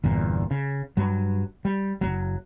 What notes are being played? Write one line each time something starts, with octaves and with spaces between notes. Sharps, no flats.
G1 E2 A#2
C#3
G2 F#3
G3
F#1 C#2 F#3